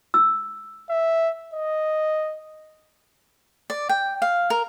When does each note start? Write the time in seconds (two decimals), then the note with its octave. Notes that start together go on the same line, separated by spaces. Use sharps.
0.14 E6
0.90 E5
1.54 D#5
3.70 D5
3.89 G5
4.22 F5
4.50 A#4